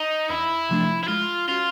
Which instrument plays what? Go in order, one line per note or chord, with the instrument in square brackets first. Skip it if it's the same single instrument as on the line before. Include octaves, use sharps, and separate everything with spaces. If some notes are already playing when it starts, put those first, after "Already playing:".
Already playing: [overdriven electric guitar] D#4
[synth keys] E2 [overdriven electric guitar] E4
[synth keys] C3 F3 A3 D4
[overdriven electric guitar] E4
[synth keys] G#3 [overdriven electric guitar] F4
[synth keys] C#4 F#4 [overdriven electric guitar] F4